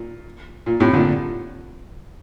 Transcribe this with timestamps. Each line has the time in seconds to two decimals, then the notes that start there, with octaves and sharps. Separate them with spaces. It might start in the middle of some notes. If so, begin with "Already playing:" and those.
Already playing: A#2
0.66 A#2
0.80 A2 C3
0.93 A#2 D3